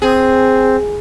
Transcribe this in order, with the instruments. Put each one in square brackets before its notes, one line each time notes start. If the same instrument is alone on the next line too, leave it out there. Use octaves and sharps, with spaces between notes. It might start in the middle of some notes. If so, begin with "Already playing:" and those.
[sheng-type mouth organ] C4 [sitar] G#4